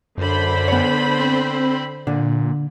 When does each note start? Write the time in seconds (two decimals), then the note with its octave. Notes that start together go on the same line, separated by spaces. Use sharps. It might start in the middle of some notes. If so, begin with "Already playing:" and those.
0.18 F#2 D3 C5 B5
0.68 B3 C#5
1.19 C4
2.07 A#2 D3